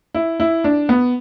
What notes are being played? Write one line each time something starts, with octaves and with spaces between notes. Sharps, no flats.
E4
E4
D4
B3